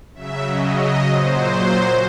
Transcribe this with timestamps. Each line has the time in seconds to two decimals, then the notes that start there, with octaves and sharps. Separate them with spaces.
0.15 C#3 F#3 E5
0.46 D#5
0.77 D#5
1.07 A#2 F#3 C5